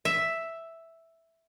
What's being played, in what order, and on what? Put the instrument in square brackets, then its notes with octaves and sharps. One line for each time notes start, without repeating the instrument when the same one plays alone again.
[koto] E5